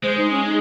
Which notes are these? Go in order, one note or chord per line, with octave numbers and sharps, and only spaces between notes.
G#3 C5
D#4
C#4
D#4